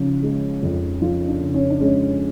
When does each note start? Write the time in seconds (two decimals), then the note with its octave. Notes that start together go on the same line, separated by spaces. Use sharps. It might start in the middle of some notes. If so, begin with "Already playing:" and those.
Already playing: C#3 F3
0.23 G#3
0.63 F2
1.02 F3 F4
1.28 D4
1.41 C#3
1.54 C#4
1.70 D4
1.80 G#3 C#4